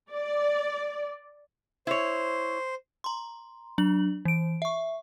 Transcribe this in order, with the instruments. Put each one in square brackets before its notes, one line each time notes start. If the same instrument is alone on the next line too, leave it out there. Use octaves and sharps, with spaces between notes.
[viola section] D5
[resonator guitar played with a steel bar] E4 C#5 [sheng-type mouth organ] C5
[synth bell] A#5 C6
F#3 D4 F#7
E3 D7
E5 C#6